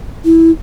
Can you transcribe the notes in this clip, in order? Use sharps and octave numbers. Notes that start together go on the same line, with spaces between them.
E4